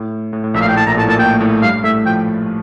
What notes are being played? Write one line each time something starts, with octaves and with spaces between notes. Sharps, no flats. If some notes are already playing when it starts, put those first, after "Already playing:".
Already playing: A2
A2
A2
A#1 A#2 E5
F5
A2
G5
A2 A5
A#1 A#2 A#5
A2 A3 A5
A#2 A#3 A5
A2 A3 G5
A2 A3
G2 G3 F5
A2 A3 E5
F3 G5